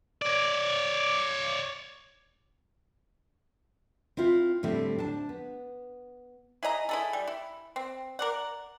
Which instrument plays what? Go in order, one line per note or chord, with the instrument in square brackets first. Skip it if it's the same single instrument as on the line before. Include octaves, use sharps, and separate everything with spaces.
[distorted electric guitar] C#5 D5
[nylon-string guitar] C4 E4 F4 C5
A2 D3 G3 C4 E4
D4 C5 A5
B3
[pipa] E4 G#4 D#5 A#5
E4 G#4 A4
G3
E4
C4
A#4 D5 F#5